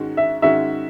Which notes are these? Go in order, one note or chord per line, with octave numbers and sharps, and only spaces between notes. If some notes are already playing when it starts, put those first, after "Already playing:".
Already playing: G#2 D#3 G#3 C#4 F#4
E5
G#2 D#3 G#3 C#4 F#4 E5